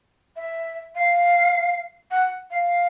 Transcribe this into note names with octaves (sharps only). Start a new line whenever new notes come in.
E5
F5
F#5
F5